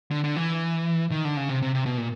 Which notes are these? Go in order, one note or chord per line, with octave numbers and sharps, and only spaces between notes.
D3
D3
E3
D#3
D3
C#3
C3
C3
C3
B2
A#2